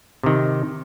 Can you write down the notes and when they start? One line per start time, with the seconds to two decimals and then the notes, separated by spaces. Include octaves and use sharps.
0.23 C3 D#3